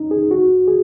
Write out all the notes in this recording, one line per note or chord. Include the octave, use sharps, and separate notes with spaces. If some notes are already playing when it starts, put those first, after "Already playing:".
Already playing: C#4 D#4
G#4
F#4
G#4